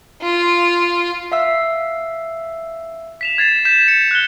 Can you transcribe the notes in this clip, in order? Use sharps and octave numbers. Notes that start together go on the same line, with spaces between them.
F4
E5 F5 E6
B6 E7 F7
G#6 A6 C7 E7
G6 B6 E7
C#7
F#6 G7